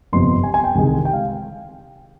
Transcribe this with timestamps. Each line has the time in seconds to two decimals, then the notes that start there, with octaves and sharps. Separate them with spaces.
0.13 G1 F2 C3 C6
0.43 G#5
0.54 G#5
0.64 G5
0.75 C2 C3 D#3 G#3
1.05 G5
1.13 F5